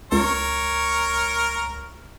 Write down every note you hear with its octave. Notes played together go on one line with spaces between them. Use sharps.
C#2 A#4 C#5